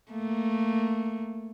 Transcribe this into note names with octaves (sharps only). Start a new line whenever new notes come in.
A3 A#3